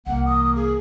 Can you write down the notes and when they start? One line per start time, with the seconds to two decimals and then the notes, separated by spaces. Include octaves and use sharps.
0.07 C2 E3 A#3 F#5
0.26 D#6
0.56 G#4